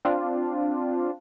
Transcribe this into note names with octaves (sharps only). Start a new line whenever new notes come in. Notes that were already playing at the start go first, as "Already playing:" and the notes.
C4 D4 F4